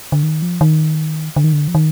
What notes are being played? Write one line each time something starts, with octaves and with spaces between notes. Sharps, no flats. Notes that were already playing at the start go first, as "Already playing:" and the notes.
D3
D#3
F3
D#3
D3
D#3
D3
F3
D#3